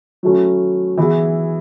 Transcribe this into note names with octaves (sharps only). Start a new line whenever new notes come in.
F#3 A3 C#4 E4
E3 B3 E4 G#4